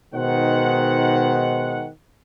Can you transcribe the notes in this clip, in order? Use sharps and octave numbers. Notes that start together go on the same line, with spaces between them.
B2 D#3 G#3 D#4 C5 F#5